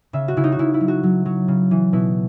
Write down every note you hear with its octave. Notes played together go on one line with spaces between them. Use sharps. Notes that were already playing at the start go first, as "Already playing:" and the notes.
C#3 E5
F#4
C#3 E4
D#4
F#4
C#3 E4
E4
F#3
F#4
F#3
F#3
C#3
E3
B2 E4